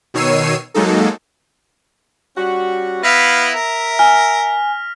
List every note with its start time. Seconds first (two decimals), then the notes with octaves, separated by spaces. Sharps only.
0.14 B2 D#3 C#5 E6 C7 D#7
0.74 F#3 G#3 A#3 D#4 A4
2.37 G3 C#4 F#4
3.03 B3 E4 E5 F5 A#6 B6 F7
3.55 A#4
3.99 G#5 F6